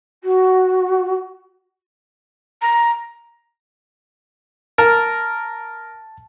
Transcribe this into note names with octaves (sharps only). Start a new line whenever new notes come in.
F#4
A#5
A#4 A5